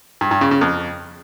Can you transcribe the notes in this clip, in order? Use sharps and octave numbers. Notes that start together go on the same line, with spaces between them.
G2
G2
C#3
C#3
F2